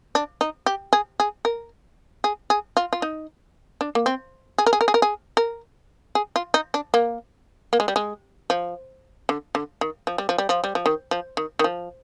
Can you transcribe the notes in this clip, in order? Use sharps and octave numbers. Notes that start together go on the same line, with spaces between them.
D4
D#4
G4
G#4
G#4
A#4
G#4
G#4
F4
F4
D#4
D4
A#3
C4
G#4
A#4
G#4
A#4
G#4
A#4
G#4
A#4
G#4
F4
D#4
D4
A#3
A#3
G#3
G3
G#3
F3
D3
D3
D#3
F3
G3
F3
G3
F3
G3
F3
D#3
F3
D#3
D#3
F3